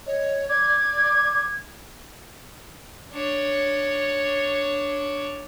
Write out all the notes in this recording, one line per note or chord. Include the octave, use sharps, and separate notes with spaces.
C#5 D#5
D5 D6 G#6
D4 C#5